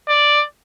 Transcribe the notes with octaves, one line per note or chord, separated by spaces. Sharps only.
D5